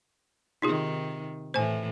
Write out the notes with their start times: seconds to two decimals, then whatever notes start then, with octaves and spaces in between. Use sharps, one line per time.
0.62 C3 D#3 D#4 F4 G#4
1.54 A2 E3 C5 G#5